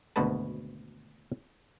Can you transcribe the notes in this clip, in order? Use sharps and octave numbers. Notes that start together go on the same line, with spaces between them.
G#1 D2 B2 F#4 B4 A5